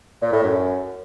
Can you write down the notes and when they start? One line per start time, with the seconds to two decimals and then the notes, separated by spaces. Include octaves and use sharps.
0.22 A#2
0.33 A2
0.43 F#2